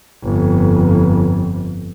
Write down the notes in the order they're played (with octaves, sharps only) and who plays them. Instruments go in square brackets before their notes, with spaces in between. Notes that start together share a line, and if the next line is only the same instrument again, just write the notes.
[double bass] G1 F2